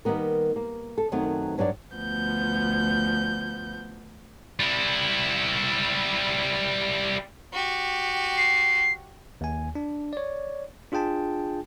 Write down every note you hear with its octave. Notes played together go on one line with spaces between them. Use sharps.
D#3 G3 A#3 B3 A#4
A#3
A4
F#2 D#3 F#3 A3 B3 C4
G2 F#3 D4 C#5 D5
D2 F3 B3 G6
G3 E4
F#4 G4
C7
D#2 G#5
D4
C#5 D5
D4 F4 G#4 G5 A5